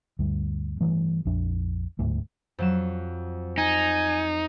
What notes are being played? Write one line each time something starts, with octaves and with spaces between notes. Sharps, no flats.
D2 G2
G2 E3 A3
A#1 F2 D4
D1 D2 G#2 A3
F2 F#3 E7
D#4 G#5